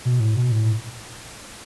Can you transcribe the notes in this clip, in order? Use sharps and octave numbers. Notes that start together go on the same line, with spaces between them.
B2
A2
B2
A2